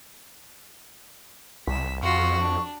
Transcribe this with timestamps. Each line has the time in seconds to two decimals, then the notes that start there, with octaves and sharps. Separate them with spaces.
1.67 C2 B6 E7
2.03 F2 F4 F#4 C#6
2.41 D4